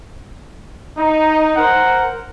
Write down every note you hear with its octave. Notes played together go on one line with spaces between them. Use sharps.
D#4
A#4 C5 F#5